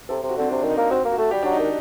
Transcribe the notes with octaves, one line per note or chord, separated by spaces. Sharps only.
C3 A4
C3
F#4
D3 C4
C3 D4
D#3
D#4
A#3
C4 F#4
A#3
F#4
A3
G3 G4
F#3 D4
D#4
D#3